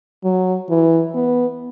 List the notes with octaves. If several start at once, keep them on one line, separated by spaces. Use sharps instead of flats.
F#3
E3
B3